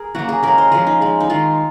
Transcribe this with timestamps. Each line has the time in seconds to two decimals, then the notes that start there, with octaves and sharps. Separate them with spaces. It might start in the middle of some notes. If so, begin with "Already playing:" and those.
Already playing: G#4 A#4
0.15 C#3 F#3 A#3 F#4
0.29 G#4
0.43 C#3 G#3 A#4
0.58 C5
0.72 C#3 F3 G#3 G#4
0.87 D#4
1.01 C#3 G#3
1.20 D#4
1.30 D#3 G#3 F4